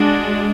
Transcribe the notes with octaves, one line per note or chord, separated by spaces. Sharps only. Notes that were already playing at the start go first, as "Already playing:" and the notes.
Already playing: G#3 D4 F#4